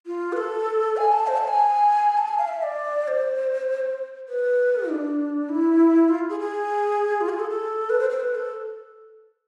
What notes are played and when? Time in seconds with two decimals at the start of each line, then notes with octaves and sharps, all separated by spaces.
0.07 F4
0.33 B4
0.37 A4
0.97 G#5
1.12 A5
1.27 C5
1.37 A5
1.48 G#5
2.18 A5
2.28 G#5
2.38 F5
2.48 E5
2.63 D5
3.08 C5
4.29 B4
4.89 D4
5.49 E4
6.09 F4
6.30 G#4
6.40 G#4
7.21 F4
7.29 G#4
7.40 A4
7.50 A4
7.90 B4
8.00 C5
8.10 C5
8.20 B4
8.35 A4